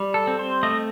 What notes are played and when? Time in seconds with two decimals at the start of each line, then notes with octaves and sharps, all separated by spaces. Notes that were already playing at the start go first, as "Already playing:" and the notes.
Already playing: G3
0.14 A4
0.27 C4
0.39 C5
0.63 A3 D#5